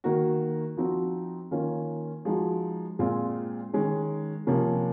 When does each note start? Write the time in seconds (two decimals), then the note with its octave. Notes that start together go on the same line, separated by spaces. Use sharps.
0.04 D#3 A#3 D#4 F#4
0.77 F3 C4 D#4 F#4
1.51 D#3 A#3 C#4 F4
2.25 F3 G#3 D#4 F#4
2.99 A#2 G#3 C4 F4
3.73 D#3 G#3 C#4
4.47 C3 F3 A#3 C#4